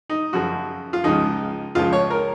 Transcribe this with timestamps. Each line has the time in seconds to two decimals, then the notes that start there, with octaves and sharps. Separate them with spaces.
0.10 D#4
0.33 F#2 C#3 F3 F#4
0.93 F4
1.04 C#2 C#3 F3 D#4
1.75 C#2 C#3 F3 F4
1.93 C#5
2.10 A#4